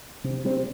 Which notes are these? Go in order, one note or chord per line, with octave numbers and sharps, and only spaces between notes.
C3
G3 C4